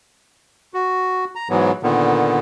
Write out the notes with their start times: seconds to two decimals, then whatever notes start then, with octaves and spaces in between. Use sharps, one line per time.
0.74 F#4
1.36 A#5
1.50 G#2 E3 F#3 B3
1.83 A#2 D3 D#3 B3